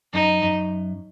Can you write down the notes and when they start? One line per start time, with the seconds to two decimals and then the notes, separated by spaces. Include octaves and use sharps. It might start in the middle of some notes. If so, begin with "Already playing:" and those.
0.13 F#2 D#4
0.43 F#2